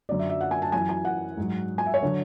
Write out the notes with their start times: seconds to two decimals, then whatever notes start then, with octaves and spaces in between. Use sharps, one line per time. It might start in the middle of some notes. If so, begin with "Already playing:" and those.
0.09 F#2 D3 F#3 D5
0.19 E5
0.30 E5
0.41 F#5
0.51 G#5
0.62 A5
0.72 F#2 E3 G#5
0.89 G#5
1.05 F#5
1.37 G#2 F#3
1.78 G#5
1.86 E5
1.94 C#5
2.03 D3 F#3